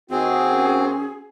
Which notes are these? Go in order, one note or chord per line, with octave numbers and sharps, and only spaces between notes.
D#2 D#3 C4 F#4 G#4 D#5
C#4